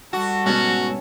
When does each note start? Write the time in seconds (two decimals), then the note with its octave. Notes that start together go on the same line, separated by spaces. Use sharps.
0.13 G3 F#4 A4
0.46 G#2 B2 C#4 F#4